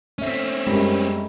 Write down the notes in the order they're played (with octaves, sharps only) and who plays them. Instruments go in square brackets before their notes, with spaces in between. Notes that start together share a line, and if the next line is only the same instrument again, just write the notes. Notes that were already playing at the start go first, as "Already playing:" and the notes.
[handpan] A3 E5 [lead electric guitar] C4 C#4
[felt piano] F#2 G3 [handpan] G#3